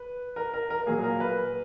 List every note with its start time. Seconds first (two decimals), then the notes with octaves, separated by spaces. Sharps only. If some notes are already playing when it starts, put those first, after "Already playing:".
Already playing: B4
0.36 A#4
0.54 A#4
0.70 A#4
0.82 A#4
0.86 A#2 F#3 A#3 G#4
1.04 A#4
1.20 B4